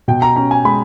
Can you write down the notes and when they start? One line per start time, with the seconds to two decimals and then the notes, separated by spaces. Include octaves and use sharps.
0.08 B2 G5
0.22 A#5
0.36 C#4 A#5
0.51 G#5
0.65 G#3 B5